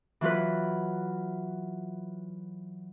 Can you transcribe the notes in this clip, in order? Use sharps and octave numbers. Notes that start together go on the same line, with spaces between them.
E3 F#3 F4 B4